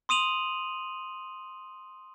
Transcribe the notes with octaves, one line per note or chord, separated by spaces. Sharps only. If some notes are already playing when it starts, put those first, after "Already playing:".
C6 D#6 D#7 F7 F#7